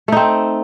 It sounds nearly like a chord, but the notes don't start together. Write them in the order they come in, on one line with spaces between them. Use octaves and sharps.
A3 D#4 C4